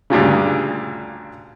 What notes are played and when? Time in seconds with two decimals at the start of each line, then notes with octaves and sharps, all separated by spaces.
0.10 D2 G2 A#2 C#3